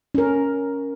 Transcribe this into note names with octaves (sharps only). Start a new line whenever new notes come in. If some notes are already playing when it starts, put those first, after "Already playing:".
C#4 A#4